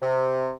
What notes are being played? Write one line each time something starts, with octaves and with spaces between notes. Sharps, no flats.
C3